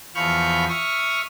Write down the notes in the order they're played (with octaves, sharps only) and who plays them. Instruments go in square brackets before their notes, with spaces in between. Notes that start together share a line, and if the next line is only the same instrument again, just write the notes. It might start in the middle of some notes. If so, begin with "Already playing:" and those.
[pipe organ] E2 F3 B5 C#6 F6 G6
E5 C#6 D#6 F6